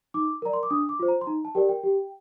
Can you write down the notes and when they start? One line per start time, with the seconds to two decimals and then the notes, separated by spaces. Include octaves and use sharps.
0.14 D#4 D6
0.42 A#4 D5 A#5
0.53 C6
0.63 D6
0.70 D4 D#6
0.89 D6
1.00 F4 C5
1.08 A#5
1.21 C6
1.27 D#4 A#5
1.45 A5
1.55 G4 A#4 D5 G5
1.69 G5
1.84 G4